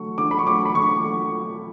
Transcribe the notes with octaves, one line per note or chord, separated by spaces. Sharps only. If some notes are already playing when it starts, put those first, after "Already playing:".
Already playing: D3 F#3 A3 C#6
D3 D6
B5
C#6
F#3 A3 D6
B5
D3 C#6
F#3 A3